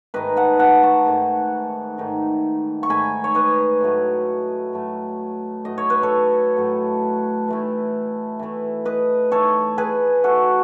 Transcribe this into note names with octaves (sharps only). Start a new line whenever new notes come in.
G#2 D#3 A3 D#4 B4 D#5
F#5 A5
F#5 A5
A5 C#6
G#2 D#3 A3 D#4
G#2 D#3 A3 D#4
C#6
G#2 D#3 A3 D#4 G#5 B5
C#5
B4 D#5
A2 F#3 A3
A2 F#3 A3
A2 F#3 A3 D#5
C#5
B4
A4 C#5
A2 F#3 A3
E3 A3 E4
E3 A3 E4
B4 D#5
E3 A3 E4 A4 C#5
G#4 B4
E3 A3 E4 F#4 A4